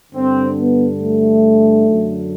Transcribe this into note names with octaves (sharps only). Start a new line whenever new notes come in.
G2 D3 C4
B3
A3
F#2 D3